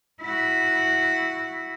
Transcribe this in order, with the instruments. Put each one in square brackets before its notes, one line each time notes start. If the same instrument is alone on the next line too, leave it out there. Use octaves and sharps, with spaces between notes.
[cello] E4 F#4